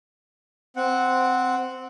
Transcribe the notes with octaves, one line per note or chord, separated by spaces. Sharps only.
C4 F#5